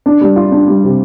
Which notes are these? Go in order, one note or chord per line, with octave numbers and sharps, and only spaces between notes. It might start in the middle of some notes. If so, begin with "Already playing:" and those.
D4
G3
F4
D4
G3
C3